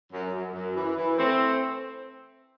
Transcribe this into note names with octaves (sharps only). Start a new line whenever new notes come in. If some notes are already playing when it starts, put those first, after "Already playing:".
F#2
F#2
F#2
E3
E3
A3 C4